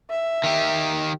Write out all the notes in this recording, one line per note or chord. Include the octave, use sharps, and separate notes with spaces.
E5
D#3 G4